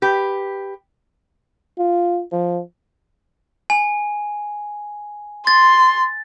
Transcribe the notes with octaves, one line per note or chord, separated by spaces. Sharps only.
G4 B4
F4
F3
G#5
C6 A6